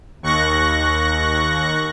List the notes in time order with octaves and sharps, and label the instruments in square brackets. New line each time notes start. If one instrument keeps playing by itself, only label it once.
[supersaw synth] D#2 C#6 F#6 A#6